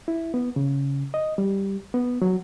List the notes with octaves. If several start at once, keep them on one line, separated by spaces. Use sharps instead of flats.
E4
B3
C#3
D#5
G3
B3
F#3